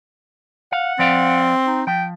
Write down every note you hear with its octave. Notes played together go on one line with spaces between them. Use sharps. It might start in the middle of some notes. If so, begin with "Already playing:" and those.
F5 F#5
F3 C4 D5 F5
D#4
F3 G5